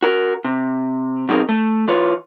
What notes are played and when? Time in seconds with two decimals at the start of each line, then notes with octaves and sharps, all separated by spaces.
0.03 F#4 A#4
0.44 C3
1.29 B2 F#3 C4 D#4 G#4 A#4
1.49 A3
1.88 E3 F4 B4 C#5